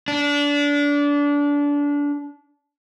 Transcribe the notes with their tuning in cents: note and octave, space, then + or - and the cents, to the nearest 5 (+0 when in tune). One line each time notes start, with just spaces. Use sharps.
D4 -25